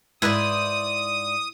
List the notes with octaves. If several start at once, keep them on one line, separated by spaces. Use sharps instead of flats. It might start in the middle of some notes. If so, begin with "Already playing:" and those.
G#2 E4 B4 C5 D5 D#6